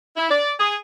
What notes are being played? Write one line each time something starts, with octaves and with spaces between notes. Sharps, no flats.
E4
D5
G#4